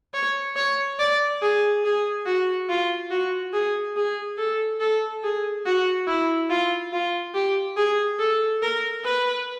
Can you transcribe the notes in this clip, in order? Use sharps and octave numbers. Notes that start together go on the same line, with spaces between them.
C#5
C#5
D5
G#4
G#4
F#4
F4
F#4
G#4
G#4
A4
A4
G#4
F#4
E4
F4
F4
G4
G#4
A4
A#4
B4